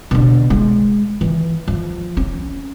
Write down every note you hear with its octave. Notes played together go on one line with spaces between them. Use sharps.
B2 D3
G#3
E3
F3
C#4